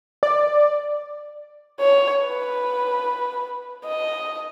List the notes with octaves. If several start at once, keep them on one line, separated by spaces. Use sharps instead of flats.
D5
C#5
B4
D#5